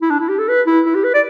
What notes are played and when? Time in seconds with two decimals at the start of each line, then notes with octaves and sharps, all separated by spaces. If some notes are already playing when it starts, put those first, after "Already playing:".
0.02 E4
0.10 D4
0.20 E4
0.29 G4
0.38 A4
0.48 B4
0.67 E4
0.86 E4
0.95 G4
1.04 B4
1.14 D5